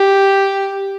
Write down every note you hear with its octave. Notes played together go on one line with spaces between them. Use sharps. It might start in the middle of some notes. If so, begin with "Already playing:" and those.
Already playing: G4